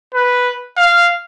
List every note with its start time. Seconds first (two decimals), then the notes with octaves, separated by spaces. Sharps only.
0.14 B4
0.78 F5